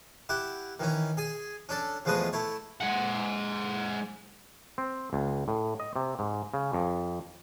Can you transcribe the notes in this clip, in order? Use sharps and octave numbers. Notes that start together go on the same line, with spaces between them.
E4 G4 F#5
D#3 E3 C#4
G#4 G#5
C#4 D4 A4
E2 F3 G#3 A3 B4 D#6
A3 E4 C#5
G#3 F#5
C4
C#2
A2
D#5
C3
G#2
C#3
F2